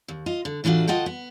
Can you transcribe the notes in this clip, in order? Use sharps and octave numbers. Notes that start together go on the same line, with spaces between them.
D#2
F4 D#5
D3
A2 E3 D4 F4 F#4
D2 F4 D#5 F#5 G5 A5
B3